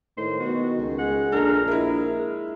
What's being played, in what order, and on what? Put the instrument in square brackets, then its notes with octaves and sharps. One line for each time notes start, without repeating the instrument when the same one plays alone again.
[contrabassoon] A2 [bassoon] D#3 [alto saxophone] C5
[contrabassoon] B2 [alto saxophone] F#4
[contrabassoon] C#2
[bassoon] G#3 [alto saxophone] F#5
[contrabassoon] A#1 [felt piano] D4 A4 [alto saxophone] A#4
[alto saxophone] G#3 [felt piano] E4 E5 [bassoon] A#4